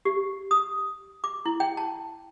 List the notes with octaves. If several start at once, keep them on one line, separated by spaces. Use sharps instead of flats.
G4
D#6
D6
E4
G5
A5